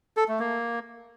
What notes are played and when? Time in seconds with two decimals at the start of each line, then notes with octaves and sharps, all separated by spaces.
0.17 A4
0.28 A3
0.39 A#3